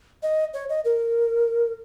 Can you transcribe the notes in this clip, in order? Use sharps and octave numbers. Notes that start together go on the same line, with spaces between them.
D#5
C#5
D#5
A#4